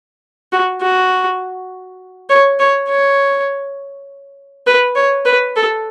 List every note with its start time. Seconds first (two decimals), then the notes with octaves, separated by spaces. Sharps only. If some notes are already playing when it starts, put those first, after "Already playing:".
0.52 F#4
0.81 F#4
2.29 C#5
2.60 C#5
2.89 C#5
4.67 B4
4.96 C#5
5.25 B4
5.56 A4